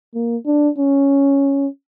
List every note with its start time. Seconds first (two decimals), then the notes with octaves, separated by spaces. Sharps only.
0.14 A#3
0.46 D4
0.78 C#4